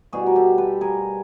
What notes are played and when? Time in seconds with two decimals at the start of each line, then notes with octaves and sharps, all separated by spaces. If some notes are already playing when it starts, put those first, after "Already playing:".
0.12 B2 G3 F#4 G#4
0.27 A#4
0.36 G4 A4
0.58 A4 B4
0.81 G#4 A#4